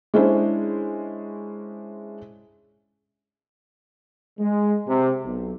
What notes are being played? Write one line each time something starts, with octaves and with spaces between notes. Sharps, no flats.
G#3 C#4 D4 E4 C5
G#3
C3
B1